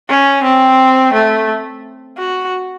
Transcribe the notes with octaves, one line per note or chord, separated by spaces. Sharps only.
C#4
C4
A3
F#4